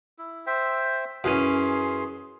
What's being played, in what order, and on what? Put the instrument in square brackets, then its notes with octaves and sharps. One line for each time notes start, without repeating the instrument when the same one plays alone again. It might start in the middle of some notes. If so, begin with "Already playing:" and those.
[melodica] E4
C5 E5 G5
[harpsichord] F#2 E3 C#4 [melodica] G#4 C6